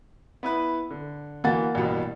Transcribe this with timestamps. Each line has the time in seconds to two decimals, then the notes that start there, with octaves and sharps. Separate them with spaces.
0.43 B3 E4 B4
0.91 D3
1.44 E3 A#3 F#4 F#5 A6
1.75 A1 G2 B2